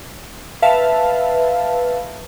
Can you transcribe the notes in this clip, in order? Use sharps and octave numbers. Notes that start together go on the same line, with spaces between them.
B4 E5 F5 A5